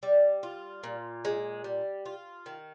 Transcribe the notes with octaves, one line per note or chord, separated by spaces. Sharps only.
G3
F4
A#2
G#3
G3
F4
D#3